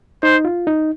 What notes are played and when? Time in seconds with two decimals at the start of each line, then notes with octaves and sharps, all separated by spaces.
0.23 D#4 C5
0.45 F4
0.67 D#4